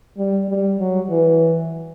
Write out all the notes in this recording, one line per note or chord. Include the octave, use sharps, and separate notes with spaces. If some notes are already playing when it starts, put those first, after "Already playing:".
G3
G3
F#3
E3